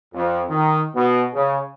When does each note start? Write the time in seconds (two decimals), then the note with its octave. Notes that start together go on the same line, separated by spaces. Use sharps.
0.14 F2
0.50 D#3
0.96 B2
1.34 C#3